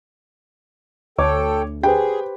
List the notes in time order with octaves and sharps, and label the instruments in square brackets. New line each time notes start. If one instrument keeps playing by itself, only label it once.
[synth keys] D2 [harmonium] A4 G5 [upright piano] C#5 D6
[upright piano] G4 B4 C5 [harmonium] G#4 [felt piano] G5